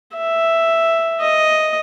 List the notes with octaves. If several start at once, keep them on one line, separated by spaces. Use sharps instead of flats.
E5
D#5